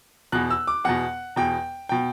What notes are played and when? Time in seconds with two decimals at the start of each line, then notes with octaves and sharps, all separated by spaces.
0.32 E2 B2 F#6
0.50 E6
0.67 D6
0.84 E2 B2 F#5
1.36 E2 B2 G5
1.89 B2 G5